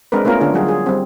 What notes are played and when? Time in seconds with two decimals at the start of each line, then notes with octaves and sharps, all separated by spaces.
0.12 G#3 C4 D4 A#4 B4
0.25 A3 B3 C#4 F4 A#4
0.40 D3 D4 F4 G#4 C#5
0.54 F#3 G3 F4 F#4 G#4
0.66 F4 G#4
0.86 G3 C4